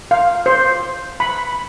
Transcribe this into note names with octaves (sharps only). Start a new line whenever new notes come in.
F5
C5
B5